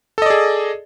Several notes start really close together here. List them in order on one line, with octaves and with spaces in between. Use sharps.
A4 D#5 D5 G#4